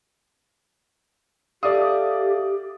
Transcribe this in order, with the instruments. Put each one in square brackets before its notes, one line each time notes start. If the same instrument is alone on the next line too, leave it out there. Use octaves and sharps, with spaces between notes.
[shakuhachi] G4 [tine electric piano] A4 E5 F5 [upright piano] D5 D#6